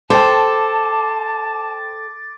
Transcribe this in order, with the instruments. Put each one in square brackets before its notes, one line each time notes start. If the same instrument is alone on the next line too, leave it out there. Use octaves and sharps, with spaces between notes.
[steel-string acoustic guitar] A4 [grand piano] C5 G5 [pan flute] A5 [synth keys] D6 A6